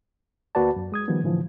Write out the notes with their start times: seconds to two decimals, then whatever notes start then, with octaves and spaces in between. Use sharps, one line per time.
0.55 D2 A#3 F#4 B4 D5 A5
0.76 F#2
0.92 G#3 D#6 G#6
1.08 D#3 F3 G3 B3
1.23 A2 D3 E3 F3